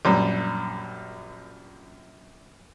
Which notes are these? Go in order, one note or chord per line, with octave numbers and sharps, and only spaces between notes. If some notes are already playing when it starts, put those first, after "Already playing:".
A#1 F#2 G3